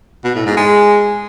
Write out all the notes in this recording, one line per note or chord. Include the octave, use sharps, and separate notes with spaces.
B2
A2
G#2
G#3